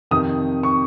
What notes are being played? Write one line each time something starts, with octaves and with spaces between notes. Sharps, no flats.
F2 C3 D#3 D#6
C#6